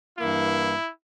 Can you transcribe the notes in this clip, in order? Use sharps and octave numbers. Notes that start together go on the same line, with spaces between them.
G2 E3 A#3 E4